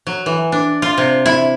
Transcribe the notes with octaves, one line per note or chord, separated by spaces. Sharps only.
F#3
E3
D4
F4
C3
E4